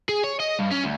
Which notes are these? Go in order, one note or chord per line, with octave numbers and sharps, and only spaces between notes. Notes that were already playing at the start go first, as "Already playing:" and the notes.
G#4
C#5
D#5
G2
C#4
D2